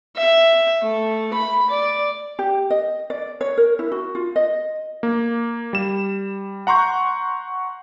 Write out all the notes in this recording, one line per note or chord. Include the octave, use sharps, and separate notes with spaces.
E5
A3
B5
D5
G4
D#5
D5
C#5
A#4
E4
F#4
F4
D#5
A#3
G3 E7
F#5 A#5 C6 C#6 G6